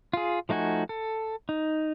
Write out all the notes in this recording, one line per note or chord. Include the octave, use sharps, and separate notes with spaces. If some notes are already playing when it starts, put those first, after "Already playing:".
F4 G#4
F3 A3 D#4 F#4 G#5
A4
D#4